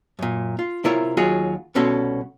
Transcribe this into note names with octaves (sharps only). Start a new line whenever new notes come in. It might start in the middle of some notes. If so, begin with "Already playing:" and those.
F#2 A#2
F4
C3 E4 F4 A#4 C#5 E5
D#2 F#3 F4 F#4 G#4
C2 B2 C#4 F#4 A4 C6